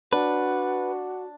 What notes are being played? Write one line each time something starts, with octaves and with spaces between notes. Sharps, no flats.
D4 F#4 B4 F#5